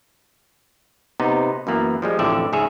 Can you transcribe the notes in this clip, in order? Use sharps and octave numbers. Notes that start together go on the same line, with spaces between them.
C3 B3 D#4
F#2 E3 A#3 B3
F3 G3 G#3
A1 F2 A2 D3 D5 E5
G#2 C#3 C#4 G#4 C#5 E5